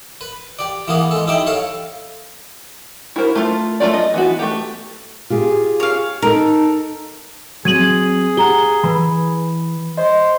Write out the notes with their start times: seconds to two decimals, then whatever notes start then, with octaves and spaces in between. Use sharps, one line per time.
0.21 B4
0.59 G4 D5
0.88 E3 A#3 B3 G#4
1.11 G#3 A4
1.27 D#4 E4 G4 E5 G5
1.47 A4 C#5 F5
3.16 E4 F#4 A#4 C5
3.35 A3 F4
3.80 A3 D#4 F4 D5
3.94 D#5
4.14 E3 B3 F#4
4.39 A3 G4
5.30 F4 G4 G#4
5.80 C#5 F5
6.22 D#4 A4 A#4
7.65 F#3 C4 G#4 G#6 D#7 F#7
8.37 G4 F#5 A#5 G7
8.84 E3 B4 B5
9.97 C5 D#5